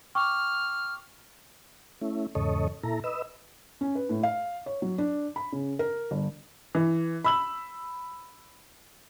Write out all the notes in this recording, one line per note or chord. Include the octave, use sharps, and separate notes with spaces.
G5 C#6 D6 F6
A3 C#4 E4
E2 G#2 C#3 A4 C#5 D#5
A#2 E4 A4 A#5
B4 D#5 E6
C#4
B4
A2
F5
C#5
F#3
D4
B5
C#3
A#4
G1
E3
B5 E6 F#7